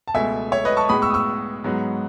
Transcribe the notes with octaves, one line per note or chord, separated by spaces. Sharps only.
A5
C#2 B2 A3 E5 G#5
C#5 E5
B4 D#5
A5 C#6
A2 G#3 B3 B5 D#6
C#6 E6
D#6
C#6 E6
G#2 F#3 B3